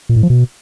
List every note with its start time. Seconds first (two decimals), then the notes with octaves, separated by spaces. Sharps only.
0.09 A#2
0.16 A2
0.23 F3
0.30 B2